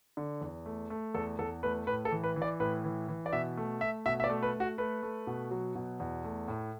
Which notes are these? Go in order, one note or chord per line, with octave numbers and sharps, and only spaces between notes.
D3
E2
A3
A3
E2 A4
E2 A4
A3 B4
A2 B4
A4
E3
B4
E3
D5
A2 B4
E3
E3
D5
B2 E5
A3
A3 E5
B2 E5
E5
D5
A3
B4
A3
F#4
A3 B4
A3
B2
F#3
B2
E2
A3
A2